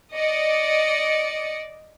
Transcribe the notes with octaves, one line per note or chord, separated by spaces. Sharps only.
D5 D#5 C#7